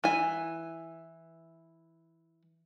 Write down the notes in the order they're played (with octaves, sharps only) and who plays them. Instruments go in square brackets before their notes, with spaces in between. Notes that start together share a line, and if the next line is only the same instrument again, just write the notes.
[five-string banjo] E3 G#5